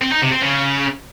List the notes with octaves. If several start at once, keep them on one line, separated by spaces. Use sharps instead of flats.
C4
D#4
C3
C4
C#3